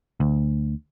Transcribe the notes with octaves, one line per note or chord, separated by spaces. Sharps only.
D2